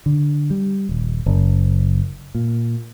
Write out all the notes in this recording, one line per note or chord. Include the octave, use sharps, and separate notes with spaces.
D3
G3
D#1
F#1
A#2